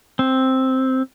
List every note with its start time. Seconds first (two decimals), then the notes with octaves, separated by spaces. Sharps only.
0.19 C4